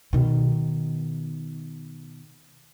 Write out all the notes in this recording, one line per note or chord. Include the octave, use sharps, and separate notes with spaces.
B2 D#3